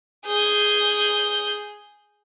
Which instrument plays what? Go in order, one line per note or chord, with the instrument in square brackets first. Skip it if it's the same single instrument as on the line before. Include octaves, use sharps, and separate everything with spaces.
[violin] G#4 G6